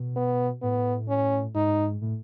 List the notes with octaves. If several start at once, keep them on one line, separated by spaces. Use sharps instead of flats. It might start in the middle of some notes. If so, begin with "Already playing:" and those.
Already playing: B2
B3
A2 B3
C#4
G#2 D#4
A2